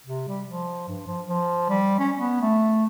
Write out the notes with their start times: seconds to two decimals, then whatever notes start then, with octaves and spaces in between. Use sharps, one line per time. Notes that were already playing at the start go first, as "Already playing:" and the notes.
0.07 C3
0.28 G3
0.46 F3
0.88 G2
1.07 F3
1.29 F3
1.70 G3
1.99 C#4
2.18 B3
2.42 A3